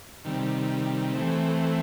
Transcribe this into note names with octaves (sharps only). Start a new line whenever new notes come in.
C3 D#3 G3
E3 A3 C4